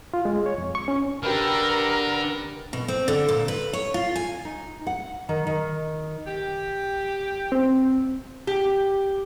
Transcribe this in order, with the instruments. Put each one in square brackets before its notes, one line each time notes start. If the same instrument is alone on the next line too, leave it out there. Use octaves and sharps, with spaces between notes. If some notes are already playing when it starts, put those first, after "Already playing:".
[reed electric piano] F4
G#3
C#5
F2
C#6
C#4
[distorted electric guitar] D3 [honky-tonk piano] G4 B4 F6 [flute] A#4
[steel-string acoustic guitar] B2
C4
D3
A#2
B4
C#5
F4
G#5
[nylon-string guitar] D#4
F#5
D#3
D#3
[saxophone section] G4
[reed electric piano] C4
[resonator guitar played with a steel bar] G4